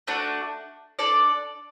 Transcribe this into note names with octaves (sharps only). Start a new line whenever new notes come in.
A3 D4 F#4
D4 A4 D5